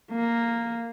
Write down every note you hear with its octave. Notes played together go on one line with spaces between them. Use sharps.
A#3